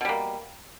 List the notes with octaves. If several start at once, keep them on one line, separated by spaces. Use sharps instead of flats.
B2 G3 A#3